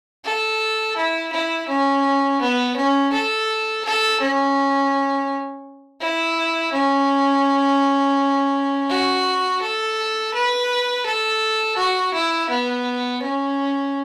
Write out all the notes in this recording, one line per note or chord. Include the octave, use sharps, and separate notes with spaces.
A4
E4
E4
C#4
B3
C#4
A4
A4
C#4
E4
C#4
F#4
A4
B4
A4
F#4
E4
B3
C#4